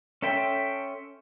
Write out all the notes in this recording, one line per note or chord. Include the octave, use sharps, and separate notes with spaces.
C#4 A4 E5 G5 C6